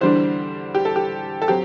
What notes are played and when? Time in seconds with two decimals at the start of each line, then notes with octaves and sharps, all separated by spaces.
0.01 E2 D3 G3 D4 C5
0.75 G4
0.85 A4
0.96 G4
1.42 A4
1.48 F#3 C4 G4